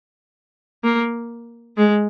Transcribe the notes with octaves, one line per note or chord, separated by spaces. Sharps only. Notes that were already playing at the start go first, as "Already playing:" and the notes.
A#3
G#3